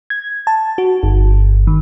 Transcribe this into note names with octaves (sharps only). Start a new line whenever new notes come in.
G#6
A5
F#4
G1
D#3